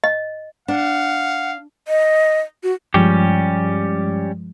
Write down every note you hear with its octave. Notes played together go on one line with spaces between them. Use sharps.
D#5
D4 F5 F#5
D#5
F#4
G2 F3 G3 G#3 C#4 G4